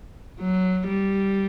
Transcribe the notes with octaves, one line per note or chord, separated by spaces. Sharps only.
F#3
G3